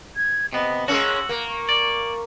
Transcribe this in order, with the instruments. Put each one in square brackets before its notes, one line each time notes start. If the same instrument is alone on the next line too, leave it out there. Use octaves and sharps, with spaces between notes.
[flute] G#6
[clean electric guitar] C3 B3 [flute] D#5
[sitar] G#3 A#3 C#4 [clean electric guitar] F#4 [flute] E6
[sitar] A#3
[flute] C#6
[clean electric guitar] D5